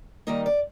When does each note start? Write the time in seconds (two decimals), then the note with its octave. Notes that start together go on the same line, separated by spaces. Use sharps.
0.27 D#3 G3 A#3 D#4 D#5
0.46 D5